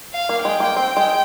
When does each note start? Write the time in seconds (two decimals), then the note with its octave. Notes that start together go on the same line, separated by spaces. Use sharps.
0.14 F5
0.29 A#3
0.44 G#3 G5
0.60 A#3
0.77 C4
0.97 G#3